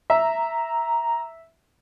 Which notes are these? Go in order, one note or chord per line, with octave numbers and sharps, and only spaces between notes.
E5 A#5